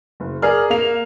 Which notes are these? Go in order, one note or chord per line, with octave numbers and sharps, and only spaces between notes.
F#1
G#4 A#4 D5 F6
A#3 F7